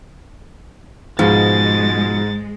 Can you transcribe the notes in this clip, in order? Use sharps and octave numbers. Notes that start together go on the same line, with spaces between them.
G#2 B2 F3 G#3 A6